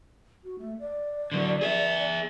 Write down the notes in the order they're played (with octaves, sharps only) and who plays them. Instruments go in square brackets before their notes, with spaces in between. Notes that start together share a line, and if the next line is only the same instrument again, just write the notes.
[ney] F#4
A3
D5
[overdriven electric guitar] D3 F#3
G#4 E5